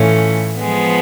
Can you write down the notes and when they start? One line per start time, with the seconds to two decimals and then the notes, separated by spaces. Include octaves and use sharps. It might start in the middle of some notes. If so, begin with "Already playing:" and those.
Already playing: A2 E3 A3 C#4 F4
0.60 F3 G#3 B3